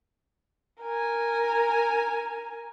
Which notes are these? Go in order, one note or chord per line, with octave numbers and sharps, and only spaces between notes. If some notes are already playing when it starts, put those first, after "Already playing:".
A#4 G#5